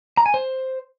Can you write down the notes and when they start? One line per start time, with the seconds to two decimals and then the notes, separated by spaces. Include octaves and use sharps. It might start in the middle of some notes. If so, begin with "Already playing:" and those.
0.17 A#5
0.26 G#5
0.34 C5